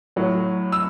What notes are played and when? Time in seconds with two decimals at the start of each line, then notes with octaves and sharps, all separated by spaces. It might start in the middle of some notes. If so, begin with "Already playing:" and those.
0.16 A2 F#3
0.72 E6